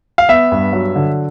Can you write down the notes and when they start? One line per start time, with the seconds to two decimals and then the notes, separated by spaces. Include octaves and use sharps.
0.18 F5
0.29 B3 E5
0.52 G2
0.73 F#3
0.96 D3